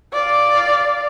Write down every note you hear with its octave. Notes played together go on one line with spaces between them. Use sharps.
D5 F5